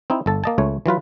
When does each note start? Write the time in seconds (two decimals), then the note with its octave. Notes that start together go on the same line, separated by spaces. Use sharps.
0.10 C4 D#4 E4
0.26 G1 A4 A5
0.44 A#3 D#5 A5
0.58 C#2 A3 C#5
0.86 E3 F#3 F4 B4